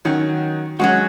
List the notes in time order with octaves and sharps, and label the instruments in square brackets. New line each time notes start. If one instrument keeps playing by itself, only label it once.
[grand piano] D#3 [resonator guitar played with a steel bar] F#3 C#4 F#4
[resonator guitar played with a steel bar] F#3 C#4 F#4 [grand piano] G#3